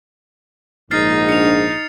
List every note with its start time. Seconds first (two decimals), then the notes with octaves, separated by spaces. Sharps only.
0.91 A#1 G#2 D#4 F6 A6 C7
1.29 D4 C#7 F7